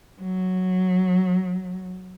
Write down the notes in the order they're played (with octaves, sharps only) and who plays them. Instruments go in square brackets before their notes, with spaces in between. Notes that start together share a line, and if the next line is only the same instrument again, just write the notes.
[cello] F#3